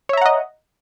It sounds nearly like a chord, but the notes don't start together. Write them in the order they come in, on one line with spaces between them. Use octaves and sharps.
C#5 E5 A#5 F#5 D#5